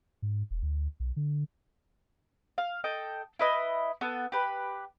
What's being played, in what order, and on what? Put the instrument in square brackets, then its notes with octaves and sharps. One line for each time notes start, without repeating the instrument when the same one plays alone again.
[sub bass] G#2
E1
D2
B1
D3
[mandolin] F5
A4 D#5 G5
E4 B4 D#5
B3 A4
G4 B4